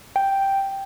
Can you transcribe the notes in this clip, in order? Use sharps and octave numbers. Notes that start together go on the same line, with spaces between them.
G5